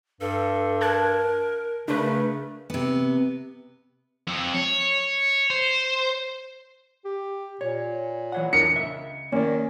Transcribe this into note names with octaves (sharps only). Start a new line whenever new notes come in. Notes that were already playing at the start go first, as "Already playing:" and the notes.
G2 A4
A#4 A5 F#6 G#6
C#3 A3 D4 A#4 B4
C3 B3
F2
C#5
C5
G4
A#2 C#5
E3 C#5 F#5
D4 A#4 C#7
C#2 E5
D#3 A#3 C#4 D5